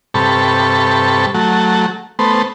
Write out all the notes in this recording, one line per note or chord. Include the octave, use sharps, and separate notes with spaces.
G2 C3 A4 B5 C#6
F#3 A3
A3 B3 C5